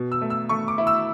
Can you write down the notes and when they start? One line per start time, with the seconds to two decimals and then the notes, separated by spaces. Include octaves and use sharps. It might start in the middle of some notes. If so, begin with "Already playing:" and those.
Already playing: B2
0.12 E6
0.22 A3
0.30 E6
0.49 A3 C#6
0.68 D6
0.78 E4
0.87 E6